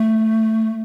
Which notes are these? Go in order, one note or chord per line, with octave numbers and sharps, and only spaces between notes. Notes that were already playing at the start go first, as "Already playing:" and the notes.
Already playing: A3